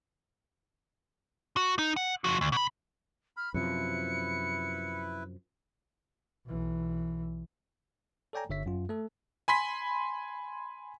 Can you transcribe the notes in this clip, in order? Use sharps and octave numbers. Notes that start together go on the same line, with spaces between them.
F#4
D#4
F#5
F3 F#4
D2
B2 B5
B5 F6
F#2 C3 F3 E4 B4 C#7
B1 E3
A4 C#5 D5 G5 G#5 A#5
G1 D3 C#5 E5 B6
F#2 F4
A3 A4
G#5 B5 C6 B6